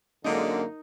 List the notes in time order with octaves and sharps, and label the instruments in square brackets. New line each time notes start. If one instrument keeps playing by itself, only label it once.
[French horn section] F#2 A#3 [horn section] D3 G#3 [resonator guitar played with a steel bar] D#4 A#4 D#5